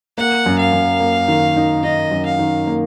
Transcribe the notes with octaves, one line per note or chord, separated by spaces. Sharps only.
A#3 F#5
F#2
F5
F#2
A#3
D#3
D#4
D#4 D#5
F#2
F5
D#3
A#3